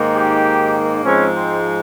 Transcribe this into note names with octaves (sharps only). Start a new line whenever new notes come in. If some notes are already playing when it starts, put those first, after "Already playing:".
Already playing: G#2 D#3 A#3
G4
G#2 F3 G#3 C4 C#4
C4